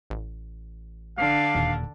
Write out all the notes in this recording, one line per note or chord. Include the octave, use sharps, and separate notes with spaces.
A1
D3 D4 F5
D1 D#2 A#2